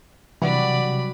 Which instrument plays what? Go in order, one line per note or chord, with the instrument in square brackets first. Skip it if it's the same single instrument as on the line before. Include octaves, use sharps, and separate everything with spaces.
[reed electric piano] C3 [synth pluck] E3 [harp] F#3 G3 D4 [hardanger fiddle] D5 B5